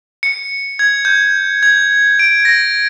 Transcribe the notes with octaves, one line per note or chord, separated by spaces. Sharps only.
C#7
G#6
G6
G#6
D7
A#6